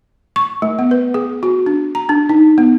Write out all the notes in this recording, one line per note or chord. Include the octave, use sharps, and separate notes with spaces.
C#6
A3
B3
B4
G#4
F#4
D4
A#5
D4
D#4
B3